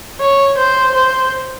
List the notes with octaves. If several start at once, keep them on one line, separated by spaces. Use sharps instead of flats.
C#5
C5
C5